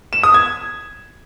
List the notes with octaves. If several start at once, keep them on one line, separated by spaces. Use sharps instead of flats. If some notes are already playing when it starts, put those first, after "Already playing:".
E7
D#6
G#6